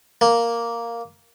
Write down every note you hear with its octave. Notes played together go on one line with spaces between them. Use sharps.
A#3